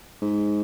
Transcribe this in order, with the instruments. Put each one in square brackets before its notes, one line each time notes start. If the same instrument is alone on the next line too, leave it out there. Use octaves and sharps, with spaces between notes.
[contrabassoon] G#2